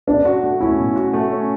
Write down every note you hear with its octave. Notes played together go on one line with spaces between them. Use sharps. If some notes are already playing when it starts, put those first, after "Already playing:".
B2 D4
F#4
A3
C#4 E4
B2
F#4
A3
C#4